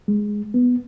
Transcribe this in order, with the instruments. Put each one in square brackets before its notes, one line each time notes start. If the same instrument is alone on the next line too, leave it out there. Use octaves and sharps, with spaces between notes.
[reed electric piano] G#3
B3